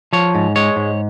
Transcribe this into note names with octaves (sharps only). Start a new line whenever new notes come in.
F3 C#5
G#2
G#3 C#5
G#2